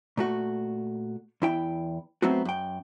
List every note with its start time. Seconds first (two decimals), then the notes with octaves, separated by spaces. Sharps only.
0.17 A#2 A3 F#4
1.42 E2 E4 G5
2.22 F#3 A3 B3 C4 D#4 F#4
2.45 F#2 G5